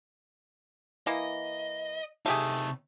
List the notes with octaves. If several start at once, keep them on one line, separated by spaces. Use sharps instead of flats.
E3 A#3 D#5
C3 A3 D#4 G4 G#4